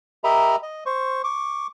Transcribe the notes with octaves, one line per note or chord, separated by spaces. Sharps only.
G4 A#4 D#5 E5 A#5 B5
D#5
C5 C#6
C#6 D6